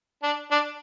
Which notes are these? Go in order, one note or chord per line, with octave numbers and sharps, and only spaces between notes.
D4
D4